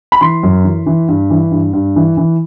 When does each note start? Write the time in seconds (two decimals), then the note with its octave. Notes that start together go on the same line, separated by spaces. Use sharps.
0.12 B5
0.21 E3 C6
0.43 F#2
0.64 E3
0.86 E3
1.08 G2
1.30 E3
1.51 G2
1.73 G2
1.96 E3
2.17 E3